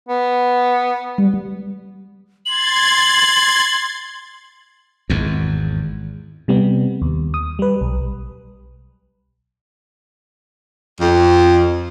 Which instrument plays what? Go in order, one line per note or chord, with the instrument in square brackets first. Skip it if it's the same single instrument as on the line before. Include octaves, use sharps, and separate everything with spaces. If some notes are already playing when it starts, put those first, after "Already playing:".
[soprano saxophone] B3
[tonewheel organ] G3
[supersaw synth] C6 G#6 A6 [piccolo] F#7
[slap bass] G#1 E2
[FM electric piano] C3 G3 B3
D#2
D#6
G3 B4
B1
[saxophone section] F2